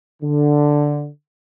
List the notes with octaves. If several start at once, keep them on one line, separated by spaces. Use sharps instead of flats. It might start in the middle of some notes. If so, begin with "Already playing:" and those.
D3